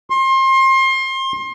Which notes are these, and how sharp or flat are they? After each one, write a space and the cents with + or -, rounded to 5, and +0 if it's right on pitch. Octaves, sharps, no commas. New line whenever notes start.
C6 +30